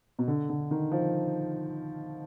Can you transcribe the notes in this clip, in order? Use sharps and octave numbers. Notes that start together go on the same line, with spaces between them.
B2
D3
D3
D#3
F3